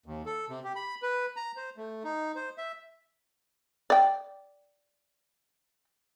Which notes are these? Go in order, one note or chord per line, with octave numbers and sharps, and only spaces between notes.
D#2
A4
C3
G4
B5
B4
A#5
C5
A3
D#4
C5
E5
D5 G5